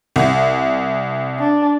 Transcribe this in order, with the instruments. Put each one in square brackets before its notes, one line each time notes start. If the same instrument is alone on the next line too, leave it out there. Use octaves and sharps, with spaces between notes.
[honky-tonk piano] C2
[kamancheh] D4